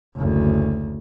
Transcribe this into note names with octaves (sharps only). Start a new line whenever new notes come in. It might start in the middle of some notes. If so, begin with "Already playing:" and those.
F#1 D2